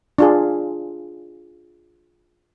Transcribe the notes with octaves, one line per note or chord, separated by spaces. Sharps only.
D4 F4 G#4